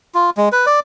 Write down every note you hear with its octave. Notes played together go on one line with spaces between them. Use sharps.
F4
G#3
B4
D5